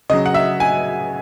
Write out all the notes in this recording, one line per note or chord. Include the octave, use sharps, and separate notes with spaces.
C#3 F#3 D#5
F#5
E5
G#5